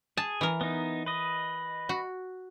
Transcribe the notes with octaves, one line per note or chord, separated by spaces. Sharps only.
G#4 A5
E3 A#4
B3 D#4
B4 D#5
F#4